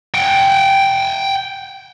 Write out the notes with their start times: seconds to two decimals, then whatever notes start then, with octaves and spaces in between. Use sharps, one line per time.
0.14 F#5 G5